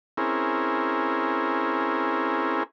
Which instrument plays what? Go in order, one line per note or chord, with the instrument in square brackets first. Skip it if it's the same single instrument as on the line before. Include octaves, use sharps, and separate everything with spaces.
[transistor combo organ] C4 C#4 E4 G#4 A#4